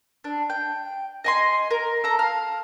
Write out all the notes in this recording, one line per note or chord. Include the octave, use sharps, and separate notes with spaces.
D4
G5
D#5 G#5 C6
A#4
A4 A#5
F5